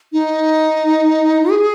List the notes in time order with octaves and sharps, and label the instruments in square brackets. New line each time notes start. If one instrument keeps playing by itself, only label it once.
[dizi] D#4
G#4